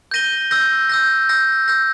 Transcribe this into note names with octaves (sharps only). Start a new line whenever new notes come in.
G6 A#6 D#7 G7
E6 G6 A#6
E6 G6 A#6
E6 G6 A#6
E6 G6 A#6